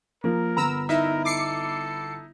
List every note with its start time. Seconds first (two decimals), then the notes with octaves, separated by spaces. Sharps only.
0.24 F3 A#3 A#4
0.57 G1 B3 A#5 B5 E6
0.89 D#4 E4 A#4 E5
1.25 A4 D6 C7 C#7